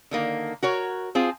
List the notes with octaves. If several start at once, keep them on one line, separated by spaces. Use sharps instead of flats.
D3 D#3 A#3
F#4 A#4 C#5
C4 F4 G#4